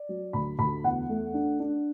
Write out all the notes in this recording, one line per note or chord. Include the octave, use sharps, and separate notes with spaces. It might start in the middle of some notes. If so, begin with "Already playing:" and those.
Already playing: D5
F#3
D2 B5
D2 B5
E2 F#5
A3
D4
D4